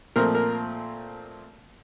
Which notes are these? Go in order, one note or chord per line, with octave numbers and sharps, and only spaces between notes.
A#2 F3 A3 C4 A#4
A#4